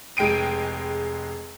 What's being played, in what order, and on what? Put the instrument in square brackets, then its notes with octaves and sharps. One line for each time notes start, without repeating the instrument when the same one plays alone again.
[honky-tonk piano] F1 G#3 G5 D7 D#7